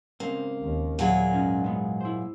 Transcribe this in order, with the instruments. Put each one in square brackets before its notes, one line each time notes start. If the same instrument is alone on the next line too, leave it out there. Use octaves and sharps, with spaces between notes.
[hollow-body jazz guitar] G#2 C#3 C4 [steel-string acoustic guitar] A#3
[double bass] D#2
[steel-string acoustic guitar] A#2 F#3 G#4
[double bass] G#2 [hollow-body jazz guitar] B3 C#4 D#4
[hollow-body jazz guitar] G#3 B3
E4 C5